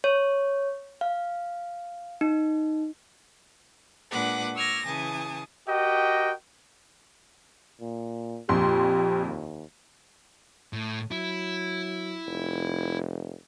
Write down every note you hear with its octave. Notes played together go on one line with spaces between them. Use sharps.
C#5
F5
D#4
A#2 G#3 D4 B4 F#5 D6
C#6 D6 E6 F6 G#6 A#6
C#3 E3 G#5 A5 D#6
F#4 G4 A#4 D#5 G5
A#2
A#1 F2 G4 C6
D#2
A2
F#3 E4
F1